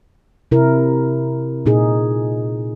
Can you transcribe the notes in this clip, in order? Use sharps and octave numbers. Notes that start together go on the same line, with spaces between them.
C3 E4 A#4
A#2 D#4 G#4